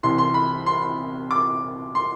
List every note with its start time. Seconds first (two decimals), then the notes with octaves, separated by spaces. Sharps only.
0.03 C2 C3 E3 C6
0.18 C6
0.34 B5
0.66 C6
1.31 D6
1.95 C6